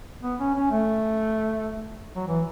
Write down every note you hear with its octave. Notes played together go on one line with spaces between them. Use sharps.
B3
C#4
C#4
A3
F#3
E3